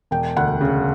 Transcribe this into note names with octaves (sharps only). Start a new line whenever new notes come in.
E1 G5
D2 F#5
C#3